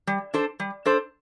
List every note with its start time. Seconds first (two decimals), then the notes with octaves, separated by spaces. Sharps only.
0.07 G3
0.34 D4 A4 C5
0.60 G3
0.86 D4 A4 C5